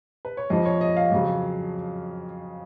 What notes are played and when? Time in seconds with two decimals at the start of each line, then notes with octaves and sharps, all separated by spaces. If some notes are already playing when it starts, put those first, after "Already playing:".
0.25 B4
0.37 C#5
0.50 F2 F3 D#5
0.66 C#5
0.81 D#5
0.97 F5
1.12 F2 C#3 F#3